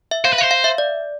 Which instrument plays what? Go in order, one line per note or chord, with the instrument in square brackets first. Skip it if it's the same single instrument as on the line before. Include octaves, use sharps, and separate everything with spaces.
[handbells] E5
[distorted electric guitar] C5 [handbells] F5
[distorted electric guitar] B4
[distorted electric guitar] C5 [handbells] F5
[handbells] F5
E5
D5